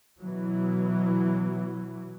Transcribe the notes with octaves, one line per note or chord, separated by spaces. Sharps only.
B2 E3 F#3